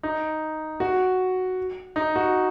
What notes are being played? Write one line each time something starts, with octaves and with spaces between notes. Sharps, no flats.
D#4
F#4
D#4
F#4